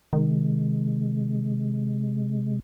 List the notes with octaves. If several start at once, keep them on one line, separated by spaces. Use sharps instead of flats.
C3 D#3 G#3